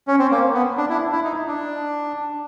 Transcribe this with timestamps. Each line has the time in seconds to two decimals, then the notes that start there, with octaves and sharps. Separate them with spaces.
0.07 C#4
0.19 C4
0.31 A#3
0.54 B3
0.77 D4
0.89 E4
1.12 E4
1.24 D#4
1.47 D4